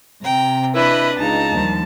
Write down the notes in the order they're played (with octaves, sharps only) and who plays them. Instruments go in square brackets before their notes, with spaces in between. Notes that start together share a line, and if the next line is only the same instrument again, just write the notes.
[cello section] C3 [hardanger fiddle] G5 A#5
[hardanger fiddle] D4 D#5 [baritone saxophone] E4 [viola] B4 B5
[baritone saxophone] C#2 [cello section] D#4 [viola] A5 [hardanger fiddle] A#5
[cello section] D#2 F3 G3